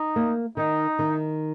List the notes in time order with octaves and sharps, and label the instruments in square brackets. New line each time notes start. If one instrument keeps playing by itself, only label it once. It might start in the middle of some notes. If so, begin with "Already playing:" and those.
Already playing: [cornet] D#4
[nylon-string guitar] A#3
[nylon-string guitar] D#3 [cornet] D#4
[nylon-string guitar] D#3